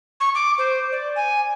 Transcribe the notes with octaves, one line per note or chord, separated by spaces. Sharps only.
C#6
D6
C5
D5
G#5